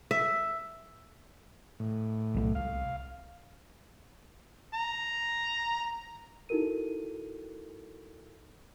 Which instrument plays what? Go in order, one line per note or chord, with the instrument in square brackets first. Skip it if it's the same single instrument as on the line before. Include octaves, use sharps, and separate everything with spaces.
[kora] E5
[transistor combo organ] A2
[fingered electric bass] B1 D#3 A3
[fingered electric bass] C2 [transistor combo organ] F5
[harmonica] A#5
[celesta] D#4 E4 F#4 A4 A#4 D#7